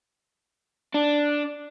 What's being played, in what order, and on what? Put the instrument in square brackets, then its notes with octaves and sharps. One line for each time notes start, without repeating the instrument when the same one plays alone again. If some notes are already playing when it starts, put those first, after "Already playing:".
[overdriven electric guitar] D4